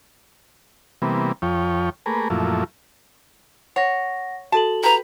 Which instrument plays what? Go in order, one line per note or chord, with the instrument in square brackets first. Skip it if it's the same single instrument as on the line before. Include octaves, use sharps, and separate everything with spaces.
[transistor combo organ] C3 E3 G3 A#3 B3
F2 F3 C#5 G5
A3 A#3 G#4 A#4 B4
F#2 A#2 F3 A3 E4
[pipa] C#5 [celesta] F#5 A#6
[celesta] F#4 A4 F#7 [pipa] A5
[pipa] G4 B4 [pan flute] A#5